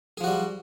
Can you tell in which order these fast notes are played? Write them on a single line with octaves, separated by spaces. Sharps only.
G#4 F3 F#4 G3